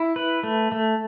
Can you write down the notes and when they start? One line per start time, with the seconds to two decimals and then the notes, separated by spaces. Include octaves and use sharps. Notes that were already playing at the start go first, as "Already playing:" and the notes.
Already playing: E4
0.16 B4
0.43 A3
0.72 A3